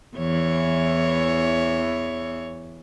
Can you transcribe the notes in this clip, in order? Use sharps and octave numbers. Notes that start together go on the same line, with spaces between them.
E2 E3 C#5